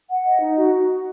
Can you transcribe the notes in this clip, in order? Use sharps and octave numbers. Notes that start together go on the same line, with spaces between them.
F#5
D#5
D#4
F#4